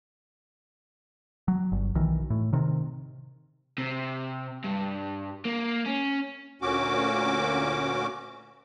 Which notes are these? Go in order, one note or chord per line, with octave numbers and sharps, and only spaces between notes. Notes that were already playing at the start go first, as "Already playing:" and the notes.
F#3
G1
B1 D#3 E3
A2
C3 D#3
C3
G2
A#3
C#4
D2 A#2 C#4 F#4 D6